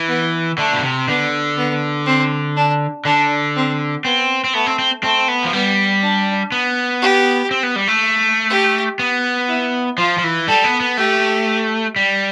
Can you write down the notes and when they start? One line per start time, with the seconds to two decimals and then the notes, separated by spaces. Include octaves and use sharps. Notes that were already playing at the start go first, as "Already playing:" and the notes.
Already playing: E3
0.08 B3
0.58 D3 A3
0.73 B2
0.83 C3
1.08 D3 B3
1.57 B3
2.06 C4
2.56 D4
3.05 D3 D4
3.55 C4
4.04 B3 C4
4.44 C4
4.54 A3 B3
4.66 C4
4.79 C4
5.03 A3 C4
5.28 B3
5.45 F3
5.53 G3 B3
6.03 D4
6.52 B3
7.01 G4
7.51 C4
7.63 B3
7.76 G3
7.88 A3
8.50 G4
8.99 B3
9.48 E4
9.98 F3 F4
10.18 F3
10.24 E3
10.48 G3 A4
10.64 B3
10.80 B3
10.97 A3 G4
11.96 G3